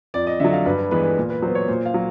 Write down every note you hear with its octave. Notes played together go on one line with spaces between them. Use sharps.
F2 D5
D#5
D3 F#3 E5
F5
G2 B4
B4
E3 G#3 B3 B4
B4
A#2
B4
F#3 C5
B3
C#5
A#2 C5
F5
F#3